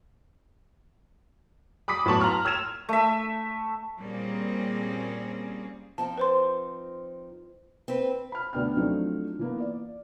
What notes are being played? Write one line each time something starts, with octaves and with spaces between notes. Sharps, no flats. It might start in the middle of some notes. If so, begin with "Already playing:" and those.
B5 D6 D#6 B6
A2 F#3 B3 A5 C#6 F#7
A#5 C6 F6
E6 F6 G#6 E7 F7
A3 E5
A#2 G3 A#3 C4 C#4 G#4
F3 C4 D#4 A5
B4 C5 C6
C4 B4
B5 F6
D2 B3 D4 G5 F6
F3 F#3 A3 C4 D4 D#4
E3 A#3 B3
D5